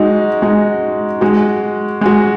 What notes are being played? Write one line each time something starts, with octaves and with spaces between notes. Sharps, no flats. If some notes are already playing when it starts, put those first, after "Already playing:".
Already playing: G#3 D#4 F#4
G#3 D#4 F#4
G#3 F#4
G#3 F#4